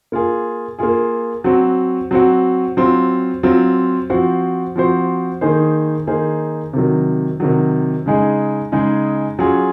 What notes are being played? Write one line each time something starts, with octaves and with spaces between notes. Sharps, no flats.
A#3 F4 G#4
A#3 F4 G#4
F#3 C4 F#4
F#3 C4 F#4
F#3 C4 F4
F#3 C4 F4
F3 C4 F#4 C5
F3 C4 F#4 C5
D#3 A#3 D#4 G#4 C5
D#3 A#3 D#4 G#4 C5
C3 D#3 F#3
C3 D#3 F#3
C#3 G#3 D#4 G#4
C#3 G#3 D#4 G#4
F#3 C#4 F4 G#4